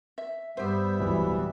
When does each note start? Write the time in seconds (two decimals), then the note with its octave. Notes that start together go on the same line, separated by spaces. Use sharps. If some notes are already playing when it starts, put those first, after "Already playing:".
0.18 E5
0.57 G2 G3 B3 G4 C5 E5
1.00 D1 E3